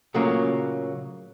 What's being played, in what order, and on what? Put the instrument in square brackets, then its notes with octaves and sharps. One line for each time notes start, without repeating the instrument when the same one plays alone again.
[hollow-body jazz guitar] A#2 C#3 F#3 A3 A#3 C#4